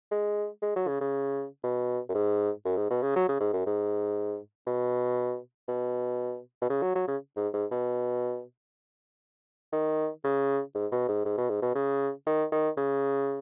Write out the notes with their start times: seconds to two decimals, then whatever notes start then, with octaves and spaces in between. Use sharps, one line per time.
0.11 G#3
0.62 G#3
0.76 F#3
0.88 C#3
1.01 C#3
1.64 B2
2.09 F#2
2.15 G#2
2.65 F#2
2.77 G#2
2.90 B2
3.03 C#3
3.16 F#3
3.29 C#3
3.40 G#2
3.53 F#2
3.66 G#2
4.67 B2
5.68 B2
6.62 B2
6.70 C#3
6.82 F#3
6.95 F#3
7.08 C#3
7.37 G#2
7.54 G#2
7.71 B2
9.73 D#3
10.24 C#3
10.75 G#2
10.92 B2
11.08 G#2
11.25 G#2
11.38 B2
11.50 G#2
11.62 B2
11.75 C#3
12.27 D#3
12.52 D#3
12.77 C#3